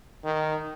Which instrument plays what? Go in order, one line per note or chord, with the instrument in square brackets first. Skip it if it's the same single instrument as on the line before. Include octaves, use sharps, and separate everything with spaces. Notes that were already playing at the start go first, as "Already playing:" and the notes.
[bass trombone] D#3